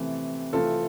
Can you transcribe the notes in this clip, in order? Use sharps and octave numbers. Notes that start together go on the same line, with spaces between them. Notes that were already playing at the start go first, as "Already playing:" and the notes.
Already playing: C3 E3 A3 C4
C3 E3 A3 C4 F4 A4